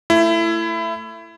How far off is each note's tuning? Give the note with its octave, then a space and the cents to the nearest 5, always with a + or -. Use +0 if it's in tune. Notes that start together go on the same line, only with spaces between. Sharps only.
A3 +25 E4 +20